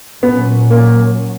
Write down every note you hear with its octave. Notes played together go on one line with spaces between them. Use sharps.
A#2 F#3 B3 C#4
A#3